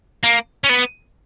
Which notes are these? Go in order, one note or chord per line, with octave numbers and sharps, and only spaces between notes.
A#3
C#4
B3